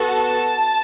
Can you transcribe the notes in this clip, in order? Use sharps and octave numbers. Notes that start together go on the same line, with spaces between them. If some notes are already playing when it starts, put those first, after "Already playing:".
Already playing: B3 F#4 A4
A5